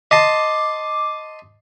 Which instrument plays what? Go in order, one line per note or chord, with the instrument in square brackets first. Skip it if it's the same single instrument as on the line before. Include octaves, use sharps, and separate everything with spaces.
[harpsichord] D#5 A5 C6 [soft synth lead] D6